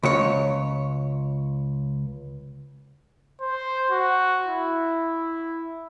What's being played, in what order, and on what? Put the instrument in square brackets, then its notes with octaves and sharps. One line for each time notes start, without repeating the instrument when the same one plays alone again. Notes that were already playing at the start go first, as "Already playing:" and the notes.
[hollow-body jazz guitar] C#2 C#5
[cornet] C5
F#4
E4